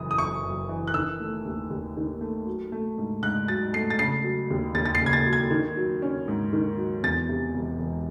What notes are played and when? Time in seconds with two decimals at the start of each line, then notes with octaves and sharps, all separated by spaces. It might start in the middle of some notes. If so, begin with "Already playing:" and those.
Already playing: F#1 F#2 E3 D#6
0.11 D#6
0.18 F#1 C#6
0.44 F#2
0.69 E3
0.87 F#6
0.94 D#3 E6
1.20 A3
1.45 D#2
1.70 D#2
1.97 D#3
2.21 A3
2.47 F#3
2.72 A3
2.98 G#2
3.23 G#2 F#6
3.48 F#3 A6
3.73 A3 C7
3.90 A6
3.99 C#3 C7
4.24 F#3
4.50 D#2
4.75 D#2 A6
4.85 A6
4.95 C7
5.01 C#3
5.06 G#6
5.13 A6
5.26 F#3
5.33 G#6
5.51 D#3
5.77 F#3
6.02 C#4
6.28 G#2
6.53 D#3
6.77 F#3
7.03 E2 A6
7.29 C3
7.55 E1
7.79 E1